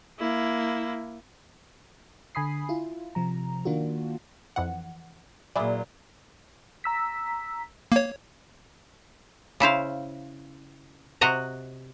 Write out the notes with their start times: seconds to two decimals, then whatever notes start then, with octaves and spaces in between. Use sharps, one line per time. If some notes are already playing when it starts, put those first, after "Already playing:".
0.19 A#3 E4
2.35 D3 G#5 B5 D#6 C7
2.69 E4 F4
3.15 C3 F3 A#5
3.65 D#3 A#3 D4 F4 F#4
4.56 F2 E3 F#5
5.56 A#2 F#3 E4 G#4 D5
6.84 A#5 E6 B6
7.92 A#3 C#5
9.60 C#3 E4 C5 F5
11.21 C3 F#4 D#5 A#5